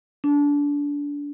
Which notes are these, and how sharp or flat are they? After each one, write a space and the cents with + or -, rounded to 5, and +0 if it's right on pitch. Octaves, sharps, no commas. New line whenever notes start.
D4 -25